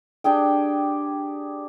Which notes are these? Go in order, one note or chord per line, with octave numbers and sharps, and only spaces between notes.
D4 G4 G#4 G5